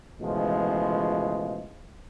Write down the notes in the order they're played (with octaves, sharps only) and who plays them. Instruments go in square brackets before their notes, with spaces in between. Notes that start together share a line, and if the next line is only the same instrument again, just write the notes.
[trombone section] C#2 B2 E3 F3 G#3 A3